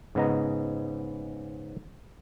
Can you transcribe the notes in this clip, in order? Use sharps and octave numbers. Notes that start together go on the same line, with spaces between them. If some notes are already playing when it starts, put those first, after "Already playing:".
G#2 C#3 B3 D#5 A#5